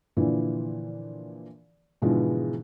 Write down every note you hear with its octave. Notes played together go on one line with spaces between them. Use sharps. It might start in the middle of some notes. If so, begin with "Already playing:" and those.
A#2 D3 E3 F3
G#2 B2 D3 E3 F3 G#3